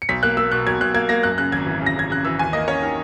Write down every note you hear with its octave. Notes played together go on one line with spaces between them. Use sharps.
C#7
B1 B6
A#3 F#6
A#3 E6
B2 F#6
B1 G#6
B1 F#6
A#3 G#6
A#3 A#6
F#2 F#6
C#3 F#6
G#1 G#6
E3
C#3
A#6
C#3 G#6
C#3 F#6
E3 E6
D#2 G#5
A#3 D#5
C#4 C#5
D#3